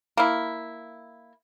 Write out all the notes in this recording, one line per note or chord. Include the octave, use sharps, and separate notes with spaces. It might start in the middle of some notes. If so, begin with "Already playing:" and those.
A#3 E4